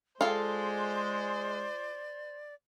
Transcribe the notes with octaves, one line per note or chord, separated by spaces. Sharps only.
G#3 F4 A4 C5 D5